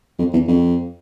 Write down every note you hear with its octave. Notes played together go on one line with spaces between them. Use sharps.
F2
E2
F2